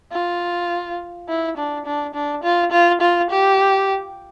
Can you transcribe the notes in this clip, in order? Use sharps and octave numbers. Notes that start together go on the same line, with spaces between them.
F4
E4
D4
D4
D4
F4
F4
F4
G4